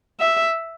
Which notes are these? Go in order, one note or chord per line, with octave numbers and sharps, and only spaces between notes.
E5